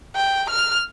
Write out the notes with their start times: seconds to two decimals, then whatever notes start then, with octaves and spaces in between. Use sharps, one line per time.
0.16 G5
0.50 F6